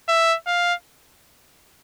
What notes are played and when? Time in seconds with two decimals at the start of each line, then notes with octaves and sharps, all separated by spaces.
0.08 E5
0.47 F5